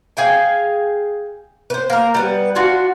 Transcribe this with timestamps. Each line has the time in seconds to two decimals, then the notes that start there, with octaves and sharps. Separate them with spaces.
0.17 G#4 F5 G5 G#5
1.70 B4 C5
1.90 A#3 A#4
2.14 G3 B3 B4
2.55 D4 F4 F#4